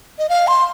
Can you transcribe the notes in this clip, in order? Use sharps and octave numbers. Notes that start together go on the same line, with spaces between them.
D#5
F5
C6